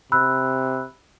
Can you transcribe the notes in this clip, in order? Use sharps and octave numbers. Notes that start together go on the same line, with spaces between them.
C3 B5 E6 F#6